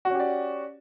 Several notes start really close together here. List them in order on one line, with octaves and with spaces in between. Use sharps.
F#4 C#4 G4 D5